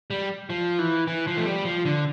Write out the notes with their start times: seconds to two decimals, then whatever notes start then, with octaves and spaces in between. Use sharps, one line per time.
0.10 G3
0.50 F3
0.79 E3
1.07 E3
1.27 F3
1.37 A3
1.46 G3
1.65 F3
1.85 D3